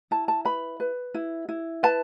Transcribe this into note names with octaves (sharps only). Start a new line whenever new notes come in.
E4 A5
A5
B4 B5
B4
E4
E4
B4 A5